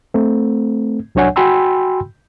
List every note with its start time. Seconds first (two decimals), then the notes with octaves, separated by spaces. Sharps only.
0.14 A3 C4
1.15 C2 F#3 D4 C#5 F#5 G#5
1.36 F#4 G5 G#5 B5 C6 E6